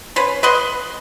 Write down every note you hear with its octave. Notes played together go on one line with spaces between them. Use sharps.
C#4 B4 C5
B4 D#5 F#5 C6